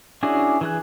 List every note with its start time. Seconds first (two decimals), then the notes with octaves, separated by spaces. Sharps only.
0.23 C#4 D4 E4 F#4 G#4
0.61 E3 G#4 F#6